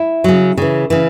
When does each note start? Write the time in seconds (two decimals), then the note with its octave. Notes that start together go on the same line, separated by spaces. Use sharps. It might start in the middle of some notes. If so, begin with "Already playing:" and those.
Already playing: E4
0.24 C#3 F#3
0.57 C#3 E3
0.90 C#3 E3